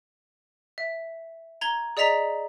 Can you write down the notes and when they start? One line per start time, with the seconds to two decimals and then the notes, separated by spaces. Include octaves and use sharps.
0.78 E5
1.61 A#5 G#6 G7
1.97 G#4 D5 D#5 A#5 B6 F7